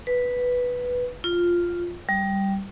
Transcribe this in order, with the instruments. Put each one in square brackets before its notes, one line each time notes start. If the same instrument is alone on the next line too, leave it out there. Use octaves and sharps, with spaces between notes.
[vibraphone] B4
F4
G3